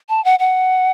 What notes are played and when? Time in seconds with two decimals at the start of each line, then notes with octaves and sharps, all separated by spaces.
0.09 A5
0.25 F#5
0.39 F#5